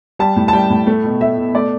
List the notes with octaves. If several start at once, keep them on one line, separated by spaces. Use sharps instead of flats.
G3 A5
A2
A5
G3 G5
A2
A3
B2
A3 E5
B2
A3 D5